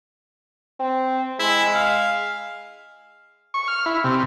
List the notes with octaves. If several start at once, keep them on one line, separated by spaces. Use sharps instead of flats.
C4
G#3 E4
F5
C#6
F6
E4
C3